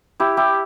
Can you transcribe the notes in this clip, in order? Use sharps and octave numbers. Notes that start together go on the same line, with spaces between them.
E4 G4
E4 G4